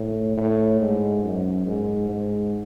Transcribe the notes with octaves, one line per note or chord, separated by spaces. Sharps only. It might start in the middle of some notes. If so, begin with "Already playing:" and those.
Already playing: A2
A2
G#2
F#2
G#2
G#2